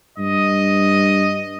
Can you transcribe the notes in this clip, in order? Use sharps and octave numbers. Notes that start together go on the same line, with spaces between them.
G2 D#5